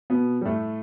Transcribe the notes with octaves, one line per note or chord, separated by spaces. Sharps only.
B2 B3
G3
A2 A3